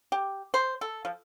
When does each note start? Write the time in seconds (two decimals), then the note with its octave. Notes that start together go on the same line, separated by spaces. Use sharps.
0.12 G4
0.54 C5
0.81 A4
1.05 F3